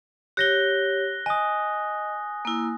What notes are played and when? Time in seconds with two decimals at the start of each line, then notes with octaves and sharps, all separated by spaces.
0.37 G4 C#5 F#6 A#6 G7
1.26 D#5 G#5 D#6
2.45 A#3 E4